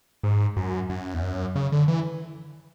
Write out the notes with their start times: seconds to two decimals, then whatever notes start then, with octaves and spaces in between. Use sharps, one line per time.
0.23 G#2
0.57 F#2
0.90 F#2
1.14 E2
1.22 F#2
1.55 C#3
1.72 D3
1.88 E3